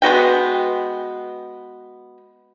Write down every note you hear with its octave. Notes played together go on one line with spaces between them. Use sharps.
G#3 B3 F#4 G5